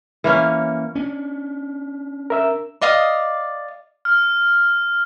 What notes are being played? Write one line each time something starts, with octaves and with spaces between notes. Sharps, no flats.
E3 A#3 C#4
C#4 D4
A#4 E5 E6
D5 D#5 F5 D#6
F6